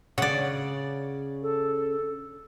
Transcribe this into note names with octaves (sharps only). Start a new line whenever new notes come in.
C#3 D5 F#5
A4